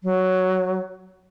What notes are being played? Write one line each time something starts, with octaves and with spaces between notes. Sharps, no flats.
F#3